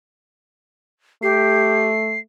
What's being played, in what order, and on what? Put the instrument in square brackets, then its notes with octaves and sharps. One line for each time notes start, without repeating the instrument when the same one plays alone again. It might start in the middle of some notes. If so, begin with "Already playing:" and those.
[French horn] A3 [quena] G4 [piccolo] C7